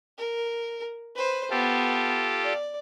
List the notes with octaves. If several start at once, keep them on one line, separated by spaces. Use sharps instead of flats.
A#4
B4 C5
B3 F4 G4 A4
D5